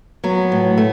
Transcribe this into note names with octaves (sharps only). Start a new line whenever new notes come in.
F#3 B3
A2
A3